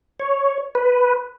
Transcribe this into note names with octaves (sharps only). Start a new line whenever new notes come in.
C#5
B4